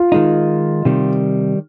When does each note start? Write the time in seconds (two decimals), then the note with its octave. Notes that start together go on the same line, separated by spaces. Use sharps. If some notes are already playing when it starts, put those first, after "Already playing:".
Already playing: F4
0.12 D#3 G#3 D#4
0.85 C3 D#3 G3